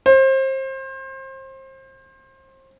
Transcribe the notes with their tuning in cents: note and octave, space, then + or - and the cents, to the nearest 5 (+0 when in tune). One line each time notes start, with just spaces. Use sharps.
C5 +30